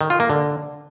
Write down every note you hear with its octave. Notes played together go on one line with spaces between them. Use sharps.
D#3
F4
A#3
D3